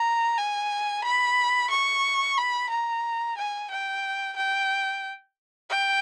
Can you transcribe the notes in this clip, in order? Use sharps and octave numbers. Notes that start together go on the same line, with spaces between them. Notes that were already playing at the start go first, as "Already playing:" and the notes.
Already playing: A#5
G#5
B5
C#6
B5
A#5
G#5
G5
G5
G5